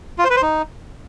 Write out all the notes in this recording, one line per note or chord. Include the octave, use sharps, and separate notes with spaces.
F4
C5
B4
C5
D#4